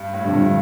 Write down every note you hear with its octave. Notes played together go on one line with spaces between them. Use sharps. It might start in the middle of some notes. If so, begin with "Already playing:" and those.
Already playing: G2
A2
F2 D3 G3
G2